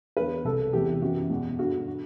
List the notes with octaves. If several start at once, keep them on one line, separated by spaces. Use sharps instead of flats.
E2 D3 B4
C2 B2 A4
E2 C3 E3 G4
F#2 E3 F#4
E2 B2
G2 D3 F#4
D3